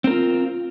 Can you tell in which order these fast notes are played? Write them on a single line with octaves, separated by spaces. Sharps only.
C4 A#4 F4